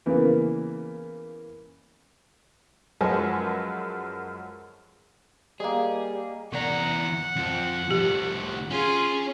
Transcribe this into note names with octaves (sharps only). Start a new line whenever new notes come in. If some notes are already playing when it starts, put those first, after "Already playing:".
C#3 E3 A#3 B3
F#2 F3 G#3 A4 B4 G#5
G3 A#3 G#4 D#5
E2 C3 D5 F#5 A#5
F2 F3
C2 A3 G4
C#4 F4 G#4